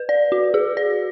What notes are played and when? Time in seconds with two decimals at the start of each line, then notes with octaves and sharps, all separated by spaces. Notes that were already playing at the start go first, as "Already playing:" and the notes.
Already playing: B4
0.09 D5
0.32 F#4
0.54 G#4
0.77 D5